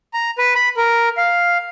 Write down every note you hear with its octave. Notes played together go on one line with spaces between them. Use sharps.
A#5
B4
B5
A#4
F5